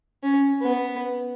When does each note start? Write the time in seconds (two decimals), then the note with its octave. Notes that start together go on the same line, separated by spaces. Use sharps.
0.23 C#4
0.62 B3